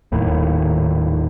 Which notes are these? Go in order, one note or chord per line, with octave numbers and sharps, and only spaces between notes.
D#1 D#2 A2 D#3